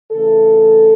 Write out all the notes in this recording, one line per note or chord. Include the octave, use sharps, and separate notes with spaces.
C#3 E3 A3 A4